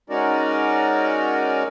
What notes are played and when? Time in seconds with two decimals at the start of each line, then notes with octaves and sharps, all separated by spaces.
0.10 G#3 C#4 D#4 F#4 A#4 D5